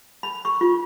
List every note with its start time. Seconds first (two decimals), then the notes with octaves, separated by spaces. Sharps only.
0.23 B5
0.45 C#6
0.61 F4